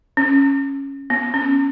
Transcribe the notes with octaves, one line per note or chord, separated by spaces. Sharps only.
C#4
B3
C#4